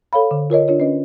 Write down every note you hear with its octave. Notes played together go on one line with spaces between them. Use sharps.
A4 C#5 F5 B5
D3
F4 A#4 C#5 D#5
D4 F4 C#5 D5
C#4 B4 D#5